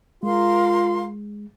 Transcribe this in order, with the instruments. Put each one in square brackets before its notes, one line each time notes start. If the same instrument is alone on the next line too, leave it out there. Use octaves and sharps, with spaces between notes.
[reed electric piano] G#3 [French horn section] F4 [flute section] A#4 F5 C6